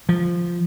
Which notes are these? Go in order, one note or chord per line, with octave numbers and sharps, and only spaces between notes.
F3